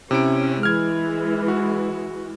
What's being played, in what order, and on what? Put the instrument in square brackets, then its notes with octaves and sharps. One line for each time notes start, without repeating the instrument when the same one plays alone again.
[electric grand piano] C3 E4 D7 [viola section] C#4
[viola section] E3 G#3 [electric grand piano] F6 G#6
[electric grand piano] F#4